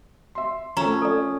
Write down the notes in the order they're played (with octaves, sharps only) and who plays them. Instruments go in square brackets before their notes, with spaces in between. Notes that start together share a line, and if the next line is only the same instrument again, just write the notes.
[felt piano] E5 C6
[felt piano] F3 A3 C4 [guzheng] C#4 [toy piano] A#5
[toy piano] A4 D5